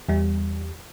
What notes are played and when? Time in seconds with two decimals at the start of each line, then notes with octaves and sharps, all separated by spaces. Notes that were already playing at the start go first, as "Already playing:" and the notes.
0.09 E2 G3